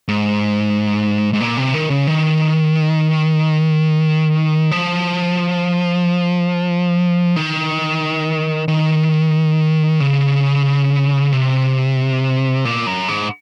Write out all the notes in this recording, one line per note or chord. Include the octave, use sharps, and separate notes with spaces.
G#2
G#2
A#2
C3
D#3
C#3
D#3
F3
D#3
D#3
C#3
C3
A#2
F#2
G#2